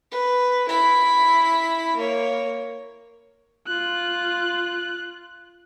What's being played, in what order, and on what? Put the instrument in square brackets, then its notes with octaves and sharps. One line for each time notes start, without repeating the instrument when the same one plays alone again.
[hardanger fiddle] B4
E4 B5
A#3 C#5
[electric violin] F4 F#6